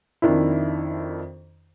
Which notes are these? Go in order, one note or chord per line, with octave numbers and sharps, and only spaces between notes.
F2 D#3 D4 E4